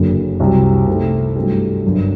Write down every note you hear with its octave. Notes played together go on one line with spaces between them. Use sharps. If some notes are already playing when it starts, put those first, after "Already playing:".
Already playing: F#1 F#2 D3
C2 C3 F#3
C3 D#3 A3
G2 F#3 A3 D4 G4
G1 F#2 F#3